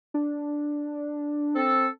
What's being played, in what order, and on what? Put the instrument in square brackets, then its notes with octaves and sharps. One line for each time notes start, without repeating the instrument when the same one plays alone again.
[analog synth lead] D4
[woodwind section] C4 A4